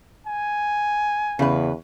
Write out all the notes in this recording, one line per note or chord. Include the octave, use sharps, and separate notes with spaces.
G#5
E2 C#3 B4